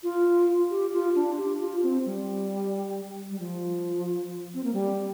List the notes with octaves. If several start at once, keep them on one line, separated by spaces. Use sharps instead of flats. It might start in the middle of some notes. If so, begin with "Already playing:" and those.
F4
G4
F4
D4
G4
F4
C4
G3
G3
F3
C4
A#3
G3